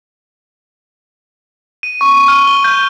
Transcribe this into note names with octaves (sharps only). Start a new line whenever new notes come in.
D#7
C#6
D#7
F6
G7
G6